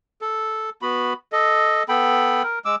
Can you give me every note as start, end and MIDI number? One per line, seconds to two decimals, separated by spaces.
0.21 0.70 69
0.82 1.13 59
0.82 1.13 66
0.82 1.13 83
1.32 1.83 69
1.32 1.83 75
1.89 2.43 59
1.89 2.43 69
1.89 2.43 79
1.89 2.43 83
2.43 2.59 70
2.65 2.76 56
2.65 2.76 86
2.65 2.76 88